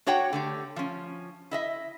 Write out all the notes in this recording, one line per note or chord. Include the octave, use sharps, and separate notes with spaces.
D4 F#4 C#5 F#5 G5
D3 A3 G4
F3 C#4
E4 D#5 E5